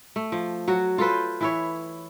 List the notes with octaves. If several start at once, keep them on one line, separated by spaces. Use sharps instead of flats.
A3
F3
F#3 F#4
F4 A4 B4 C5
E3 E4 C#5